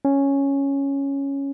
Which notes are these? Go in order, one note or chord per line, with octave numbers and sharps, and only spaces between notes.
C#4